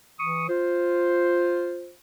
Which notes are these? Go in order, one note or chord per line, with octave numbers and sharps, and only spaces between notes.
E3 C#6 D#6
F4 C5